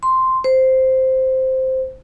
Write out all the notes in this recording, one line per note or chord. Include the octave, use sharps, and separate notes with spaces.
C6
C5